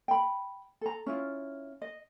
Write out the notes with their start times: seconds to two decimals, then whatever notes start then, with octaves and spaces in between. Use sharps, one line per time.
0.08 G5 B5
0.81 A4 A#5
1.06 C#4 E4 F4
1.82 D#5